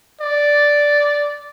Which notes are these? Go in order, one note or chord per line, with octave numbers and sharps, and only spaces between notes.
D5